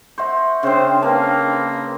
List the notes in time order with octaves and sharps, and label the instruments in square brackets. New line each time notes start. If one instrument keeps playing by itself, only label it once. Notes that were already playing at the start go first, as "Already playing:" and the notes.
[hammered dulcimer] C5 F#5 [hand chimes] E5 C#6
[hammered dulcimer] C#3 C4 [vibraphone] D4 G5 [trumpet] C5
[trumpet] A#3 [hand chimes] B4 A5 [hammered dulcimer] F5